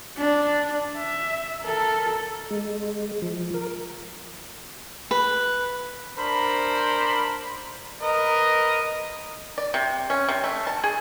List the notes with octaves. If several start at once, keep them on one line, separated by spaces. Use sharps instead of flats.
D4
E5
A4 A#4
G#3
F3
A#4
B4
D4 A#4 C5 B5
A#4 B4 D#5
D5
C3
C#4
C3
A3
A5
G#4